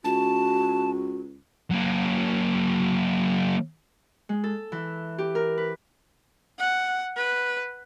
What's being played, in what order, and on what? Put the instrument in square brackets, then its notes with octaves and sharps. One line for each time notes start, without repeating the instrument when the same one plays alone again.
[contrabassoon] C#2 [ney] F#4 [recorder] A5
[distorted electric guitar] F#3 A#3
[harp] G#3
A4
E3
G4
A#4
B4
[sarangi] F#5
B4